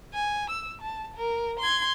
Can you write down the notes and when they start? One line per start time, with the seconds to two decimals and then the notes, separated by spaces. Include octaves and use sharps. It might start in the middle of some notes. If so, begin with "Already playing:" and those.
0.14 G#5
0.50 E6
0.82 A5
1.17 A#4
1.60 C6 G#6